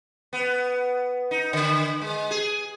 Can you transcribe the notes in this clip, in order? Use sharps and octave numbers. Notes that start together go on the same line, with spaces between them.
B3
D#4
D3
G#3
G#4